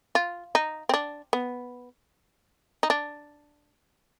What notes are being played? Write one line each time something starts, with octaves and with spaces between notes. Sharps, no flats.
F4
D#4
C4
D4
B3
D#4
D4